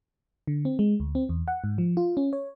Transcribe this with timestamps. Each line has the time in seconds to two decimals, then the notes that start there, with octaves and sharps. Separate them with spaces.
0.47 D3
0.65 C4
0.79 G#3
1.00 D2
1.15 C4
1.29 E2
1.48 F#5
1.64 G#2
1.78 F3
1.97 F4
2.17 C#4
2.33 C#5